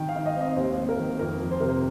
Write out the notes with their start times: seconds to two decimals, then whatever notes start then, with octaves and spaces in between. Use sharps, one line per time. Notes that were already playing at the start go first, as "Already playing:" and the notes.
Already playing: D#3 G5
0.09 F5
0.15 D#4
0.26 D#5
0.36 C4 D#5
0.56 D#2 C5
0.78 A#3
0.89 A#4
0.99 D#3
1.19 F2 A#4
1.41 F3
1.51 C5
1.60 C3 A#4
1.69 C5